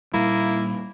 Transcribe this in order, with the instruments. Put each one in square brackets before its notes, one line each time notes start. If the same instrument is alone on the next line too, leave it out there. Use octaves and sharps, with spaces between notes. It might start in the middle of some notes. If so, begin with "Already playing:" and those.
[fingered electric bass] A#2 G3 [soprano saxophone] A#3 [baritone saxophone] E4